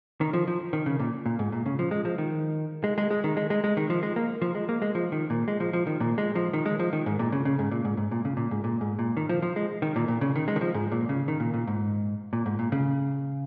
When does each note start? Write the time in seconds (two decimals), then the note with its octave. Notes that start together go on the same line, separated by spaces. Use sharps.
0.21 D#3
0.33 F3
0.47 F3
0.73 D#3
0.86 C#3
1.00 A#2
1.26 A#2
1.39 G#2
1.52 A#2
1.66 C#3
1.79 F3
1.91 G#3
2.05 F3
2.18 D#3
2.84 G#3
2.98 G#3
3.11 G#3
3.24 D#3
3.37 G#3
3.50 G#3
3.64 G#3
3.77 D#3
3.90 F3
4.03 G#3
4.16 A#3
4.42 F3
4.55 G#3
4.69 A#3
4.82 G#3
4.95 F3
5.12 D#3
5.30 A#2
5.48 G#3
5.60 F3
5.73 F3
5.87 D#3
6.00 A#2
6.18 G#3
6.35 F3
6.53 D#3
6.66 G#3
6.79 F3
6.93 D#3
7.06 G#2
7.19 A#2
7.32 C#3
7.45 C#3
7.59 G#2
7.71 A#2
7.85 G#2
7.97 G#2
8.11 A#2
8.25 C#3
8.37 A#2
8.51 G#2
8.64 A#2
8.81 G#2
8.99 A#2
9.17 D#3
9.29 F3
9.42 F3
9.56 G#3
9.82 D#3
9.96 A#2
10.08 A#2
10.21 C#3
10.36 D#3
10.48 G#3
10.56 D#3
10.61 F3
10.74 G#2
10.92 A#2
11.09 C#3
11.28 D#3
11.40 A#2
11.54 A#2
11.67 G#2
12.33 A#2
12.46 G#2
12.59 A#2
12.72 C#3